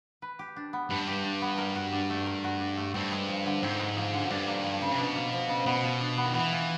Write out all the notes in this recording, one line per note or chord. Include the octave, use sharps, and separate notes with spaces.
B4
G4
D4
B3
G2 B4
G4
D4
B3
A#4
F#4
D4
A3
A#4
F#4
D4
A3
G2 C4
G#3
F3
D3
G#2 C4
G#3
F3
D3
F#2
G2 D4
A#3
F3
C#3
C3
B2 D4
A#3
F3
C#3
B2 B3
F4
D4
B3
D#3
E3 B3
F4